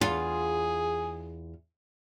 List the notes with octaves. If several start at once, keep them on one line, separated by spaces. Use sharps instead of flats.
E2 F4 G#4